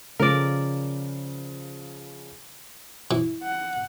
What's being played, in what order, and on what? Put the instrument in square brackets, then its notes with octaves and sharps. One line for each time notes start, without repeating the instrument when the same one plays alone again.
[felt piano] C#3 F3 [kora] A#4 D5
[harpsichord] E3
[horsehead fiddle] F#5